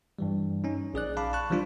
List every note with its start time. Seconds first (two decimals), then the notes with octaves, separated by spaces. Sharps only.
0.19 G2 E3 G3
0.64 C#4 D#4
0.94 A#1 G#4 D5 F#6
1.17 F5 A5 B5 D6
1.33 A5 C#6 F#6
1.50 E3 F3 G3 D4 F4